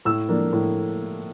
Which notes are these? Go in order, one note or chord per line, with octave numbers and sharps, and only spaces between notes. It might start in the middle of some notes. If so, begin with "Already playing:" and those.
A2 E6
F3 A#3 D4
A2